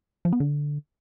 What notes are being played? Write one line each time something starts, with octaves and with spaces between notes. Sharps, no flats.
F3
B3
D3